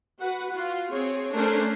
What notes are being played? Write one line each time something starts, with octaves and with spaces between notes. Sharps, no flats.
F#4 B4 F#5
F4 F#4
C4 G#4 C#5
A3 C#4 D4 A#4 C5